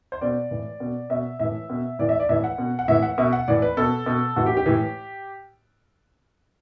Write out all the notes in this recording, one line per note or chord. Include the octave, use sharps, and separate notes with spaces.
C5
B2 D5
A2 E3
B2
B2 E5
A2 E3 E5
B2
A2 E3 D5
E5
D5
A2 E3 E5
F#5
B2
F#5
A2 E3 E5
F#5
B2 E5
F#5
A2 E3 D5
B4
B2 A4
B2
A2 E3 F#4
G4
G4
A2 E3